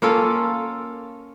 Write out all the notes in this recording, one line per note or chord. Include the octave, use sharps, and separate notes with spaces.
A#3 C#4 F4 A4